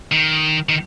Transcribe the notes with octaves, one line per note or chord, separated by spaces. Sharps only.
D#3
D#3